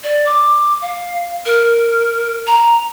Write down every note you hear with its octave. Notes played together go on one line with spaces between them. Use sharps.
D5
D6
F5
A#4
A#5